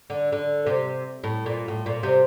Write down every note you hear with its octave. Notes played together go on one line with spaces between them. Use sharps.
D3
D3
C3
A2
A#2
A2
A#2
C3